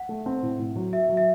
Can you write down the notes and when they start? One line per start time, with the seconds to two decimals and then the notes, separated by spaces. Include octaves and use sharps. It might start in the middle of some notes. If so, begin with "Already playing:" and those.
Already playing: F#5
0.09 A3
0.26 C4
0.43 A2
0.59 A2
0.76 F#3
0.93 F#4 E5
1.09 F#3
1.17 E5